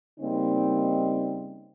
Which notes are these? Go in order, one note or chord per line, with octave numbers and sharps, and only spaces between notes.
C#3 G3 A#3 C4 D#4